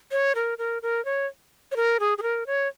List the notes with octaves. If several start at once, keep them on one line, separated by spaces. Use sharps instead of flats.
C#5
A#4
A#4
A#4
C#5
C#5
A#4
G#4
G#4
A#4
C#5